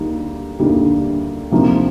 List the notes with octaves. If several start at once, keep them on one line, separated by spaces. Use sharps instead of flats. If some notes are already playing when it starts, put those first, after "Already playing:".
Already playing: D2 D3 G3 A#3 D#4
D2 D3 G3 A#3 D#4
D2 C3 F3 A#3 D#4